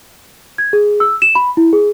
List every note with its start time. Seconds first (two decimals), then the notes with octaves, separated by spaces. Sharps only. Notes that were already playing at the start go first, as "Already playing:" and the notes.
0.58 G#6
0.73 G#4
1.00 E6
1.22 E7
1.35 B5
1.57 E4
1.73 G#4